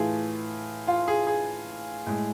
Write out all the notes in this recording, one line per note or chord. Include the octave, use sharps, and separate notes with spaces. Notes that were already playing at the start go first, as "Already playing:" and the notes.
Already playing: A2 E3 A3 F4 G#4
F4
G#4
G#4
A2 G#3